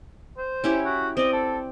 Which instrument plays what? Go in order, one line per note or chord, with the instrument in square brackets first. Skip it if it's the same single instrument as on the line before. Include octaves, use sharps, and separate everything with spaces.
[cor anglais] C5
[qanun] C#4 E4 G4
[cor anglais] F#4
[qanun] C4 D5 [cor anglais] D#5
[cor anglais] A4